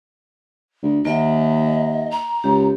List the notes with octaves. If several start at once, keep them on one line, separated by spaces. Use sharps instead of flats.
D2
D#2 A#3 D#5 E5 F#5
A#5
C#2 G4